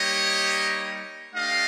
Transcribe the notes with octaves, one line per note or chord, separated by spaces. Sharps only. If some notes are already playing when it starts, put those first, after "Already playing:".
Already playing: G3 A#3 D#4 G4 C#5 D#5
A3 D4 G4 D#5 F5